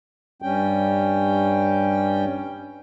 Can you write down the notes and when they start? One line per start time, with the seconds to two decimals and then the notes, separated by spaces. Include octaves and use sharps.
0.42 G2 G3 C#4 G5